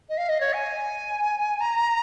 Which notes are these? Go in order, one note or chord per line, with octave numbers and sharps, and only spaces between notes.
D#5
F5
D#5
C#5
G#5
A#5